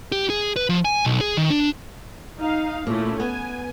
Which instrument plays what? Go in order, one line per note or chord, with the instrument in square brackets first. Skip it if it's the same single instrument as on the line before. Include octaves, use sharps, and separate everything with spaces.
[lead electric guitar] G4
G#4
B4
F3
G#5
B1
G#4
D#3
D4
[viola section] D#4 F5
[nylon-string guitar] A#2 [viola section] A3 C#4 E4
[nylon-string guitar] B3 [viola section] G#5